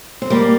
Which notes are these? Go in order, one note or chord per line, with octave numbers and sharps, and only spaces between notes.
C4
G3 A#3